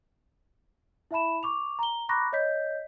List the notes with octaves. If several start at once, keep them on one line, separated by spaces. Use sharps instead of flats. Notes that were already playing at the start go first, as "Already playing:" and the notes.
E4 E5 A5 B5 E7
C#6 D6 F7
A#5 G7
A#5 B5 C#6 D6 F#6 A#6
C#5 D#5 G6 B6